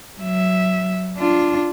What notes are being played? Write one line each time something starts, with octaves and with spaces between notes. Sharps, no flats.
F#3 E5
D4 F4